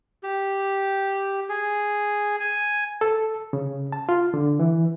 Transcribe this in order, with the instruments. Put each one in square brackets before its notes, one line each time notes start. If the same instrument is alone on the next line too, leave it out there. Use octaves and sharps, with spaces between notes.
[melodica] G4
G#4
G#5
[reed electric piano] A4
C#3
A5
F4
D3
E3